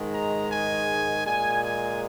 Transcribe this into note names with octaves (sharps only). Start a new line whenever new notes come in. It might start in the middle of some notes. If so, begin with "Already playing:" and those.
Already playing: G#2 D#3 G#3
A#5
G#5
A#2 G#3 G#5
G#5